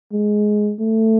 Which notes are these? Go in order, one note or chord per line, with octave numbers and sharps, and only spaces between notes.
G#3
A3